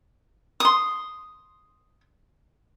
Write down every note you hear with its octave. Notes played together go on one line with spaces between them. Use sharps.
C6 D#6